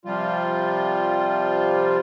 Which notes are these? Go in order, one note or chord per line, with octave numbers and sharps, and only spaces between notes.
C3 F3 G3 F4